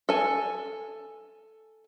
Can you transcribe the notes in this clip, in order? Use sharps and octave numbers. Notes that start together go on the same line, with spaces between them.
A4 G#5